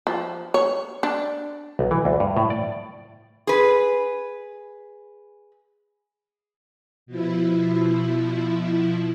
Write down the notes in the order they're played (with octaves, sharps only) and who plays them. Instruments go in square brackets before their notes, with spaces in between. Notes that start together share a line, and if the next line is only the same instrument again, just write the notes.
[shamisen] F3
C#5
D4
[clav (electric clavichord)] B1
E3
D2
G2
A2
D5
[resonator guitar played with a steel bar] G#4 B4
[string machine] B2 F3 E4